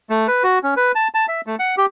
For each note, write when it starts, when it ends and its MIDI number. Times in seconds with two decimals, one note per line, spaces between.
0.10 0.27 57
0.28 0.43 71
0.44 0.59 66
0.63 0.74 61
0.77 0.92 71
0.95 1.08 81
1.15 1.26 81
1.28 1.41 76
1.47 1.55 57
1.59 1.75 78
1.78 1.86 67